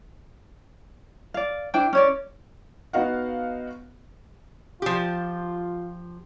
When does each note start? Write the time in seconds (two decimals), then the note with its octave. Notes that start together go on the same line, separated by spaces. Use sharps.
1.34 D5 F5
1.74 D4 E4 C5 G5
1.93 C#4 C#5 D5
2.93 B3 D#4 F#4 F5 F#5
4.82 F3 F4 G4